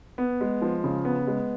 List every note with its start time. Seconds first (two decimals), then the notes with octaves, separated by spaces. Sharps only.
0.18 B3
0.41 G#3
0.62 F3
0.84 C#3
1.05 B3
1.27 G#3